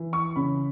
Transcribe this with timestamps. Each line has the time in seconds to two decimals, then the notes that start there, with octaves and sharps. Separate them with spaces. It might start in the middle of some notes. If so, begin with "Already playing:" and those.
Already playing: E3
0.13 C#6
0.36 C#3 B5